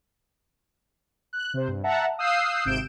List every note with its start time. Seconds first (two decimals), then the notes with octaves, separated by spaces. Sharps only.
1.33 F#6
1.54 C3 C5
1.68 G2
1.84 E5 F#5 A5 A#5
2.18 F5 D#6 E6 F#6 G6 C7
2.65 G#1 C3 G6 D7 E7